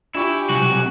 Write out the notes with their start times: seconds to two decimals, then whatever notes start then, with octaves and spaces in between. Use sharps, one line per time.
0.15 D4 E4 F4 G4 G#5 C#6
0.49 B1 C3 F#4